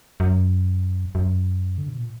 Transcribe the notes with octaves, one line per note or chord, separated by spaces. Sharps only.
F#2
F#2
D3
B2
A#2